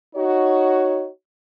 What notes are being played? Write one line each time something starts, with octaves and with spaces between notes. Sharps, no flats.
D#4 F#4 C#5